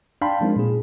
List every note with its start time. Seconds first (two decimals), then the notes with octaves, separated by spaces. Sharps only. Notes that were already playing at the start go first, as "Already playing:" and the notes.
0.21 D4 F5 G5 A5 B5 C6
0.41 F3 G#3 A#3 C4 D#4
0.56 A#2 G#4